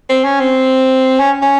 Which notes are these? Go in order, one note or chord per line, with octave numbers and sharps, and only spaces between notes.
C4
C#4
C4
C#4
C#4